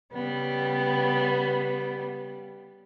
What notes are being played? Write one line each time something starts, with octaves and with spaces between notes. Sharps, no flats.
C#3 G3 B3